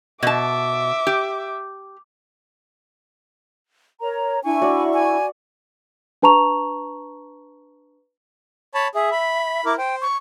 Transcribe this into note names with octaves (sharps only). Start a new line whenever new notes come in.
B2 E5 A5 D6
G4
A#4 C#5 A#5
D4 E4 G#5 C#6
F#4 D5
G#5
D4 B4 A5 A#5 C#6 F7
C#5 A5 B5
G#4 E5
B5
E4 A#4 D6
C5 G5
C#6